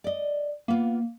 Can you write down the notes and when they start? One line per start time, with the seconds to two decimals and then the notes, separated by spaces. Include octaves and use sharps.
0.04 D5 D#5
0.68 A#3 B3 F4